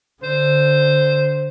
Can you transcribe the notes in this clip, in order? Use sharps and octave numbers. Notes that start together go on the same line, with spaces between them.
D3 C5